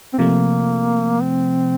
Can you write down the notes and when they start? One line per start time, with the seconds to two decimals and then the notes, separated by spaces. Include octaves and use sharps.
0.13 C4
0.18 C3 F3 A3 A#3
1.22 C4